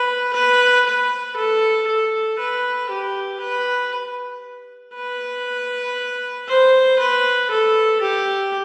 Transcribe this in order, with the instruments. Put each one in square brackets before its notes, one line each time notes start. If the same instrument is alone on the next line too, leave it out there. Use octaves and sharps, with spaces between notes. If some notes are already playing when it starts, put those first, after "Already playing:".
Already playing: [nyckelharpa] B4
B4
B4
A4
A4
B4
G4
B4
B4
C5
B4
A4
G4